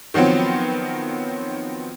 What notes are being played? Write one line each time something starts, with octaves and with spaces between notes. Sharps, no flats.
D#3 F3 F#3 B3 C4